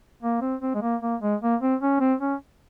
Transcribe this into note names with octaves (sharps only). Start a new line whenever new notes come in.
A#3
C4
C4
G#3
A#3
A#3
G#3
A#3
C4
C#4
C4
C#4